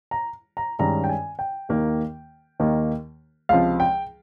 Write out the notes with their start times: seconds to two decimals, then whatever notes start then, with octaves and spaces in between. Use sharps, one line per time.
0.11 A#5
0.57 A#5
0.79 G2 D#3 G#3 C#4 A#5
1.04 G5
1.09 G#5
1.39 G5
1.69 D#2 D#3 A#3 D#4
2.60 D#2 D#3 A#3 D#4
3.49 C#2 C3 F3 F5
3.80 G5